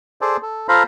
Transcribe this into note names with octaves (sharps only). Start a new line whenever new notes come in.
G#4 A4 C5 D5
A4
F4 A4 C5 F5 A#5 B5